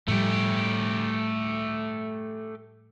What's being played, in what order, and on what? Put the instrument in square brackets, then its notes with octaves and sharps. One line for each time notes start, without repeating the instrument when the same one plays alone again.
[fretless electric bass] A2 F3 G3 [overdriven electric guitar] A3 G4